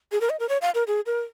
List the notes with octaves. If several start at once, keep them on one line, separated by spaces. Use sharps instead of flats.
G#4
A#4
D#5
A#4
C#5
F5
A#4
G#4
A#4